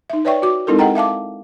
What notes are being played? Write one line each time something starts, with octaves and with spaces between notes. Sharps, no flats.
D#4 E5
B4 C#5 D5 E5 G5 C#6
F#4 D6
G#3 C4 D#4 E4 A4 A#4
G#4 D#5 F#5 G5 A#5
E5 F5 A5 D6